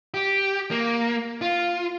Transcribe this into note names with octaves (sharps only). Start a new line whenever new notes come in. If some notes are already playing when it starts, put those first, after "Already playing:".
G4
A#3
F4